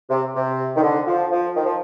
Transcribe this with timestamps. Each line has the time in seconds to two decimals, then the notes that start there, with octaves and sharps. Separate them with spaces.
0.10 C3
0.35 C3
0.76 D#3
0.82 D3
1.07 F3
1.31 F3
1.56 D#3
1.66 F3